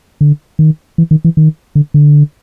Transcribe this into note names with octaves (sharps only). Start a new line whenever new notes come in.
D3
D#3
E3
D#3
E3
D#3
D3
D3